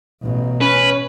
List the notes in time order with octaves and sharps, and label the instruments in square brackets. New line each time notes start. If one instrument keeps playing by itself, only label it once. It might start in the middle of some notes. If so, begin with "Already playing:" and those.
[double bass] A1 B2
[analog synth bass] C#4 [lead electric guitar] B4